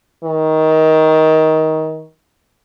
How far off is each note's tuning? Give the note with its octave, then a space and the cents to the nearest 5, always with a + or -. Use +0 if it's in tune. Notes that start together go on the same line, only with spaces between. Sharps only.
D#3 +20